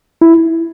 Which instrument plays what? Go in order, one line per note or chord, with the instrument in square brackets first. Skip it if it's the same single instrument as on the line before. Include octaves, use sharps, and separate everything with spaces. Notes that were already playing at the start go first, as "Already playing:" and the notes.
[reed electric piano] E4